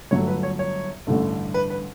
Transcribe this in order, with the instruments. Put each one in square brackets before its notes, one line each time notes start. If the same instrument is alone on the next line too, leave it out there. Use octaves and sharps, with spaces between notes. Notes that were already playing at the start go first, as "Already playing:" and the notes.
[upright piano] G1 G2 F#3 A3 [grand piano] C#5
[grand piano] B4
C#5
C#5
[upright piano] A1 G2 D3 A3
[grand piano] B4
B4